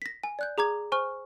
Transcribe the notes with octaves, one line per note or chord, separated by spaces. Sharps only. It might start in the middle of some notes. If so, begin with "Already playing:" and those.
A#6 B6
G#5
D5 F#6 G6
G#4 A#5 D6 G#6
C5 G#5 C#6 F6